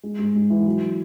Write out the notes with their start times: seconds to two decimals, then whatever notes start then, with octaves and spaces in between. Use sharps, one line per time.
0.03 G#3
0.19 G#2
0.35 G#2
0.50 E3
0.66 F#3